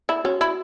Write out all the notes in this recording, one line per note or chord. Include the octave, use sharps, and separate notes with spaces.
E4
C#4 F#4
E4